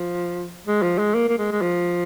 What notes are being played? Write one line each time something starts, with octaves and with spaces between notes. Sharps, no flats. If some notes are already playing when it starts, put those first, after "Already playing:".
Already playing: F3
G#3
F3
G#3
A#3
A#3
G#3
G#3
F3